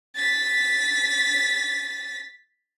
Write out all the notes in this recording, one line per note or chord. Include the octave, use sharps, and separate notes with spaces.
A6 B6